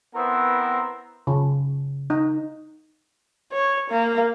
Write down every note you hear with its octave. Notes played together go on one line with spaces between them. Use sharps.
B3 C4 E4 A#4 C5
C#3
D#4
C#5
A#3